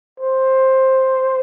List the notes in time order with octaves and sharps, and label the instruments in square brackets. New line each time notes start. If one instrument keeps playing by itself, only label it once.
[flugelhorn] C5